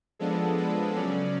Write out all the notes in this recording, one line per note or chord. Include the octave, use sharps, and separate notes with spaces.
F3 G#3 B3 D4 A4
B4
C#3 F#3 C#4 D5